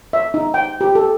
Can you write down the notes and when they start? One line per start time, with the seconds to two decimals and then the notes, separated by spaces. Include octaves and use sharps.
0.13 E5
0.34 D#4
0.54 G5
0.81 G4
0.95 A4